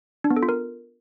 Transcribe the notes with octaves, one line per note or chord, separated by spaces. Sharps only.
D4
B3
A4
F4
A#4